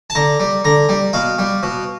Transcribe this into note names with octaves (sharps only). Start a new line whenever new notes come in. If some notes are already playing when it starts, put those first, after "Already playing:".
A5
D3 A#5
G3
D3 A#5
G3
B2 F5
G3
B2